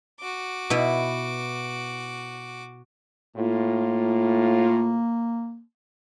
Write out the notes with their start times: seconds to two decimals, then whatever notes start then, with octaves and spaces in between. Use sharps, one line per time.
0.20 F#4 D6
0.70 B2 B3 E4
3.36 A2 A#3 F4